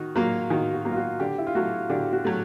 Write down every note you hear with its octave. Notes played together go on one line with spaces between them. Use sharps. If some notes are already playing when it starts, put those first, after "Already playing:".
Already playing: D#3 F#4
F#3 A#3 F4
D#3 F#4
F#4
F#3 A#3
F4
F#4
D3 G4
E4
F4
F#3 A3 F#4
D3 G4
F#4
F#3 A3